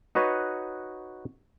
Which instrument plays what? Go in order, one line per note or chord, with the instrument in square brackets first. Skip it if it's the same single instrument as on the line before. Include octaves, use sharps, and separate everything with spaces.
[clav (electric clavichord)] D#4 F#4 B4 C#5 D#5